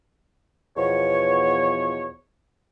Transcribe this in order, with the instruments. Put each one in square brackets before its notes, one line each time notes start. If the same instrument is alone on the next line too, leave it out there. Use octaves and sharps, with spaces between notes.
[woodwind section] E2 B2 F3 C#5